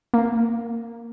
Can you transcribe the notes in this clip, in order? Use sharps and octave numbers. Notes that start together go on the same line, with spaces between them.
A#3